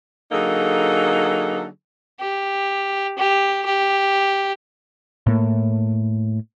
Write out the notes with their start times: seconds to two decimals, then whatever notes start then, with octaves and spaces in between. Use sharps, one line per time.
0.32 D3 F#3 A#3 D#4 G#4 A4
2.20 G4
3.18 G4
3.65 G4
5.26 A2 A#3